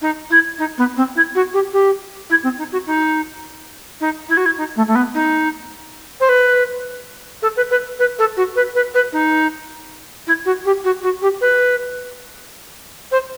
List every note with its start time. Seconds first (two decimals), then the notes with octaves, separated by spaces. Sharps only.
0.02 D#4
0.30 E4
0.59 D#4
0.78 B3
0.97 C4
1.16 E4
1.35 F#4
1.54 G4
1.73 G4
2.30 E4
2.44 C4
2.58 D#4
2.72 F#4
2.87 D#4
4.01 D#4
4.29 E4
4.37 F#4
4.46 E4
4.58 D#4
4.76 A3
4.87 A3
4.95 B3
5.14 D#4
6.20 C5
6.29 B4
7.42 A4
7.57 B4
7.71 B4
7.99 B4
8.19 A4
8.37 F#4
8.56 B4
8.75 B4
8.94 B4
9.13 D#4
10.27 E4
10.46 F#4
10.66 G4
10.84 F#4
11.03 F#4
11.22 G4
11.41 B4
13.12 C5